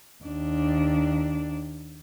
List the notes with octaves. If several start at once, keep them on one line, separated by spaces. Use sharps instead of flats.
D#2 D4